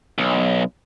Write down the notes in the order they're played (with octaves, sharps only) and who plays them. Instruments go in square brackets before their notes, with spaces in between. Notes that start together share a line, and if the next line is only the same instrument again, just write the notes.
[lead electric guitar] B1